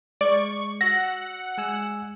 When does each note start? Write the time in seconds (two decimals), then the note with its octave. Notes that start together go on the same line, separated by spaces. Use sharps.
0.21 G#3 D5 C#6
0.81 F#4 F#5 E6 A#6
1.58 G#3 G#5 E6